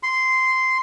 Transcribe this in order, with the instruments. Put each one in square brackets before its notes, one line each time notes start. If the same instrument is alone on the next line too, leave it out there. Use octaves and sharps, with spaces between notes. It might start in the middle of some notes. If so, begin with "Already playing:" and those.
[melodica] C6